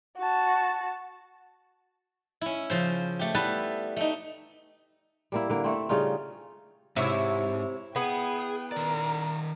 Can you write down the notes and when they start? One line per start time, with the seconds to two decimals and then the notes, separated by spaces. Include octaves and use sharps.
0.18 F#4 A5
2.41 C#4 E4
2.70 C#3 F3 C5
3.19 A3 G4
3.35 G3 B3 E4 B4 A5
3.97 A3 D#4
5.32 G3 A#3 E4
5.50 D3 A#3
5.64 A3 C4
5.89 C#3 G3 D#4 F4
6.96 G#2 C3 E4 C#5 E5
7.96 B3 G#4 G5
8.72 D#3 A#4 D5